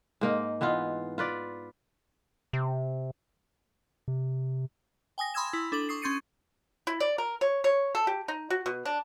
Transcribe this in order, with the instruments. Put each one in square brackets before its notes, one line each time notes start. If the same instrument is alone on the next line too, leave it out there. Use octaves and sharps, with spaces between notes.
[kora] G#2 A#3 D#4 A#4
E3 B3 D#4 F4
F4 B4 D5
[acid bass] C3
[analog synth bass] C3
[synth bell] G5 G#5 D#6 A#6
B5 C6 D#6 E6 G#6 E7
E4
D4 A4 D6 F#7
C#6 D#6 C7
C#4 C6 G6 A6 C#7 D#7
[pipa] E4
D5
A#4
C#5
C#5
A4
G4
D#4
F#4
B2
D4